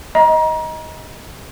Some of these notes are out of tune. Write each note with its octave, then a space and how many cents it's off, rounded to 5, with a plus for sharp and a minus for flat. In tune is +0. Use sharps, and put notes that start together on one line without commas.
D#5 +15 A#5 +30